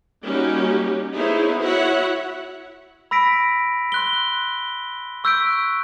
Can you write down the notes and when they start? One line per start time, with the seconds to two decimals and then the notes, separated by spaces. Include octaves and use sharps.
0.23 G3 A#3 C#4 D#4 F#4 G4
1.15 B3 D#4 E4 G#4 C5 C#5
1.60 E4 F#4 C#5 E5 F#5
3.11 B5 E6 A#6 B6 D7
3.92 C6 F#6 G7
5.24 C#6 E6 F#6 G6 B6 D7